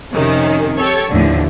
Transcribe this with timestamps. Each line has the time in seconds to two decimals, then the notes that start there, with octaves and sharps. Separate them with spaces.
0.12 F2 C3 D#3 C#4
0.77 G4 A4 C#5
1.11 D#2 A2 D3 E3 F3